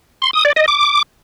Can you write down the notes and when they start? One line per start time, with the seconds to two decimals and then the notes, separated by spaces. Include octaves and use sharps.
0.22 C6
0.33 D#6
0.45 D5
0.56 D#5
0.68 D6